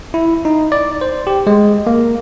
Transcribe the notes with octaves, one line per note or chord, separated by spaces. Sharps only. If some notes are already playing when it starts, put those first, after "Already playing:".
E4
D#4
D5
C5
G4
G#3
A#3